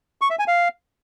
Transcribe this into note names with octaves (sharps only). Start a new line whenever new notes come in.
C#6
E5
G#5
F5